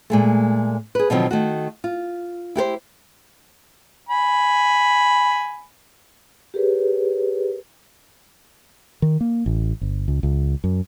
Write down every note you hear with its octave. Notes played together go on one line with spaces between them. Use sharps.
A#2 G#3 A3
G#4 B4
B2 D3 D#3 F3 F#3 C4
D#3 A3 F#4
F4
E4 G4 A4 C5
G#5 B5
G4 G#4 A#4 B4 C#5
D#3
A#3
A1
G1
C#2
C#2
F#2